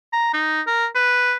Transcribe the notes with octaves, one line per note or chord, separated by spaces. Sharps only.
A#5
D#4
A#4
B4